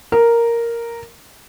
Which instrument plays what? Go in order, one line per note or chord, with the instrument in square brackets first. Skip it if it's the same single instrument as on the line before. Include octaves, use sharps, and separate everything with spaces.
[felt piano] A#4